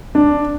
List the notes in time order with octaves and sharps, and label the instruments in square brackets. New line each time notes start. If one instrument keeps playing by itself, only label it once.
[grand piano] D4